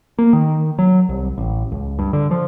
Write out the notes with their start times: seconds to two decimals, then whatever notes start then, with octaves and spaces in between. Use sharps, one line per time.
0.18 A#3
0.33 D#3
0.79 F#3
1.09 C2
1.38 A1
1.72 C#2
1.99 G2
2.13 D3
2.31 F3